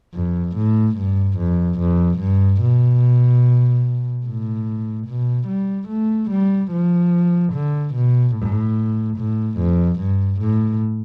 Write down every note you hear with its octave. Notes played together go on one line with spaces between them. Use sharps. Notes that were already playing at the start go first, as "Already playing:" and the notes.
F2
A2
G2
F2
F2
G2
B2
A2
B2
G3
A3
G3
F3
D3
B2
A2
A2
F2
G2
A2